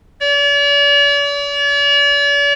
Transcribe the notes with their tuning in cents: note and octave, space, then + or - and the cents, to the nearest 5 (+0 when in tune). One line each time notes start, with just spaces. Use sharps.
D5 -45